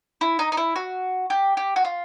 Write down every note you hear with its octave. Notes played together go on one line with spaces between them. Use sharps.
E4
D#4
D#4
E4
F#4
G4
G4
F#4
F4